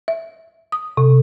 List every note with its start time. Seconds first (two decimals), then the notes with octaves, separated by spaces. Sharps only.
0.08 E5
0.72 D#6
0.97 C3